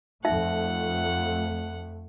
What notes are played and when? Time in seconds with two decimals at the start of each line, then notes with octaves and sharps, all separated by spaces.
0.25 F2 A3 D#4 E5 F#5